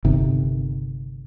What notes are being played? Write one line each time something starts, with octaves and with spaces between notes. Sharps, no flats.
G1 C3 D#3